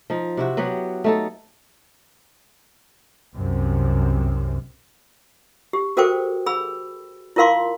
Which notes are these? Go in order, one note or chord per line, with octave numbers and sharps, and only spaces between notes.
F3 D#4
C3 E4 F#4
F#3 B3 G4 F#5
A3 D#4 A4
C2 F#2 C3
G4
F#4 A4 A#4 C5 G5 D6
G#4 B5 E6
E4 F4 A#4 F5 C6 D6